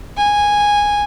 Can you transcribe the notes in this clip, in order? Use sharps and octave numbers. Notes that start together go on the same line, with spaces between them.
G#5